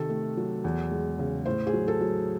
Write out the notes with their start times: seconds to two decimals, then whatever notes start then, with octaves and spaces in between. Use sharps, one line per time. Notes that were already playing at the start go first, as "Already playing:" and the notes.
Already playing: C3 D#3 A4
0.10 A3
0.37 F#3
0.64 E2
0.91 G#3
1.19 C#3
1.46 A2 C5
1.67 G#4
1.73 F#3
1.88 A4
2.01 F#3